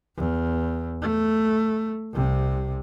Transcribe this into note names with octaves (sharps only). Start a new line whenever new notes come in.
E2
A3
C2 C3